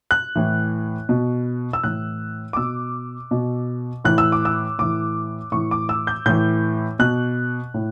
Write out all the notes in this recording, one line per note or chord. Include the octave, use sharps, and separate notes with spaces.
F#6
A2 E3
B2
E6
A2 E3 F#6
D6
B2 E6
B2
A2 E3 F#6
E6
D6
E6
A2 E3 D6
A2 E3 C#6
D6
E6
G6
A2 E3 G6
B2 F#6
A2